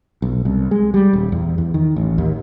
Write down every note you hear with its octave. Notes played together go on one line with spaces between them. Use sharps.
B1
C2
G#3
G3
D#1
E2
E2
D#3
A1
D#2